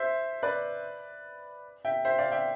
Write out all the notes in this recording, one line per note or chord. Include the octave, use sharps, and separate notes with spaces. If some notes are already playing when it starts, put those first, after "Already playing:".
Already playing: C5 E5
B4 D5
E5 G5
C5 E5
D5 F5
E5 G5